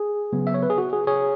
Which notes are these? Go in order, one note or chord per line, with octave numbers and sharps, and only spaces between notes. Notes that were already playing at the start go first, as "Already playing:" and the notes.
Already playing: G#4
C#3 F#3 B3
E5
C#5
B4
G#4
F#4
G#4
G#4 C#5